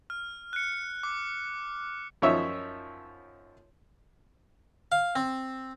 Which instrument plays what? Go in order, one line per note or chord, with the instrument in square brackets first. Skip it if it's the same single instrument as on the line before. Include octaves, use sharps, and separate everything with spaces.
[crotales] F6
F#6 C#7
D6
[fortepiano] F#2 F3 D#4 C#5 E5
[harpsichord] F5
C4